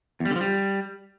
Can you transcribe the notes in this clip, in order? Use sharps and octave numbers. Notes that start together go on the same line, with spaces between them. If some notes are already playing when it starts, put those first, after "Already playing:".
E2
G3
D3
F3
G3